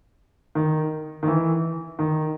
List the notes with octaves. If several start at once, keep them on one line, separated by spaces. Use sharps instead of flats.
D#3
D#3
E3
D#3